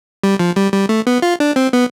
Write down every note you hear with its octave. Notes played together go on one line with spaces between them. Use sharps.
G3
F3
G3
G3
A3
B3
F4
D4
C4
B3